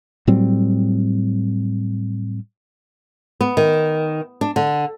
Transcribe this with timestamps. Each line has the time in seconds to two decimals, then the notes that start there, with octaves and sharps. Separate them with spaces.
0.27 A2 F#3 G3 C4
3.41 B3
3.57 D#3
4.41 D4
4.56 D3